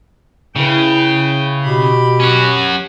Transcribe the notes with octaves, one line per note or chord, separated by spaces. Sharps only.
C#3 E4 B4 G5
B2 G4 B5
C#4 F#4